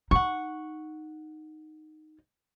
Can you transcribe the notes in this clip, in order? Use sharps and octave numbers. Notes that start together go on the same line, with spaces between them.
D#4 F#5 C#6